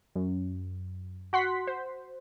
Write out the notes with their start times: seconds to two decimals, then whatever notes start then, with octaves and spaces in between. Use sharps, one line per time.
0.16 F#2
1.33 F#4 F#5 C6 B6
1.67 C5